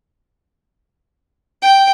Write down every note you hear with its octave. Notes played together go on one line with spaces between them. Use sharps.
G5